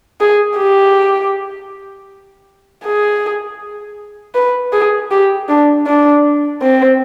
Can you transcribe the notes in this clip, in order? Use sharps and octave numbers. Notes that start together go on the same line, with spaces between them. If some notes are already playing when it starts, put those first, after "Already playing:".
G#4
G4
G#4
B4
G#4
G4
D4
D4
C4